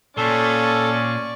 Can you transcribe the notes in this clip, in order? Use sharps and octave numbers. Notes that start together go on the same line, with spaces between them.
A#2 C#4 A4 D5 C#6